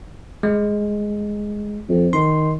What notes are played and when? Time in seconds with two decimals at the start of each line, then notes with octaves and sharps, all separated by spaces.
0.43 G#3
1.89 F2
2.13 D#3 C6